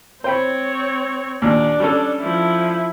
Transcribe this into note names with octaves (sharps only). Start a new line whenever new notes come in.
C4 C5 C#5 G5 B5
D#2 A#2 D4
G3 C#4 A4
F3 E4